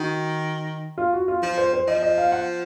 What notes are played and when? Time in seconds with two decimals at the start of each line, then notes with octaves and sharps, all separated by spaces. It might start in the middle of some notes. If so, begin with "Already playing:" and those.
Already playing: D#3 F#4
0.98 F4
1.13 F#4
1.28 F4
1.43 F3 F4
1.58 C5
1.73 C5
1.87 F3 D#5
2.03 D#5
2.18 F5
2.32 F#5